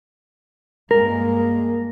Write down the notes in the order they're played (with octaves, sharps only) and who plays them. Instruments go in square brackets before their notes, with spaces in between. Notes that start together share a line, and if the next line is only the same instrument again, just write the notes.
[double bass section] G2 G#3 A#3 [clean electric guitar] A#4